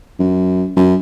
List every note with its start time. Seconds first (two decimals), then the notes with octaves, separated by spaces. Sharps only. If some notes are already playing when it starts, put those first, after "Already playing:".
0.19 F#2
0.77 F#2